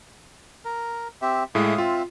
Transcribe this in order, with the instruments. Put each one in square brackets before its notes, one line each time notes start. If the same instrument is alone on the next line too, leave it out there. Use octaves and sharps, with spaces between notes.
[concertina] A#4
C4 G4 E5
[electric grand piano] A2 G#3 [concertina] E5 F5 D#6
[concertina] C4 E5 [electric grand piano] F4